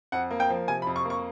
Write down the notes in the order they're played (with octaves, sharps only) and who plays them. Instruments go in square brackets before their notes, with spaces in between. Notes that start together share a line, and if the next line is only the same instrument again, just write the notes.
[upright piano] F2 F#5
A#3
G5
F3
C3 G#5
B5
F2
C#6
A#3
C#6